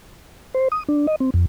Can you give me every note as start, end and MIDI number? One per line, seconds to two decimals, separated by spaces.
0.54 0.68 72
0.72 0.83 87
0.88 1.07 62
1.07 1.15 75
1.20 1.30 60
1.34 1.45 41